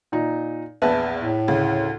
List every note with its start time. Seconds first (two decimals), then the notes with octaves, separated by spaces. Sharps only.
0.12 A#2 D#4
0.82 A#1 E2 B4 E5 A5
1.20 A2
1.48 D2 C#3